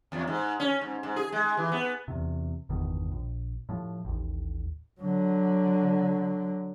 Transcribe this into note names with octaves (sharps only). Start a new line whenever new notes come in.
E2
G#2
C#4
G#2
G#2
G#4
G#3
E3
B3
E2 C3
G1 E2 B2 D#3
A#1
A2 F3
A1 D#2
D3 F#3